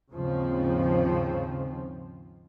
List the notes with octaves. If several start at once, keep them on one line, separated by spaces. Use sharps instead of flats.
D#2 G#2 C#3 F3 C4